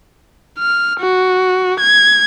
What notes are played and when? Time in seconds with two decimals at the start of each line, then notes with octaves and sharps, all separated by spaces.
0.59 F6
1.00 F#4
1.80 G#6